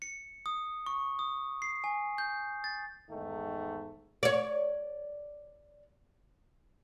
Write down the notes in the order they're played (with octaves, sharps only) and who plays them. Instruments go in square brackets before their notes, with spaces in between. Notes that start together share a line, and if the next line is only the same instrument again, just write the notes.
[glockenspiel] C#7
D#6
C#6
D#6
C7
G#5
G6
A6
[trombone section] E2 G#2 D#3 A3
[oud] C#5 D5